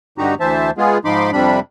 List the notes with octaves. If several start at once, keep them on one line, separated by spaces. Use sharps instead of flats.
G2 D3 D#4 F#4 G4 A#5
D2 E3 C5 E5 A5
G#3 B3 F4 G#4
G#2 F3 D#4 B5 C6 D6
F2 C3 G3 D4 B5